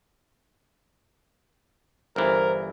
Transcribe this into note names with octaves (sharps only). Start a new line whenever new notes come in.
G1 E3 A#4 C5